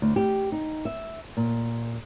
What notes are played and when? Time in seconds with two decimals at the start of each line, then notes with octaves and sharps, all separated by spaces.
0.02 D2
0.16 G4
0.52 D#4
0.85 E5
1.37 A#2